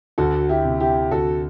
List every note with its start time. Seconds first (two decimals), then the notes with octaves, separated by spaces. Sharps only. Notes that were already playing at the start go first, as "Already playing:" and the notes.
0.18 D2 F#4 A4
0.49 E4 G4
0.65 C3
0.80 E4 G4
1.11 D2 F#4 A4